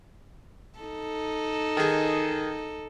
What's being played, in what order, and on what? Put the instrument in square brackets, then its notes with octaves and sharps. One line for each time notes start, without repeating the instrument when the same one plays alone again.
[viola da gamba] D#4 A4
[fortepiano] D#3 G#4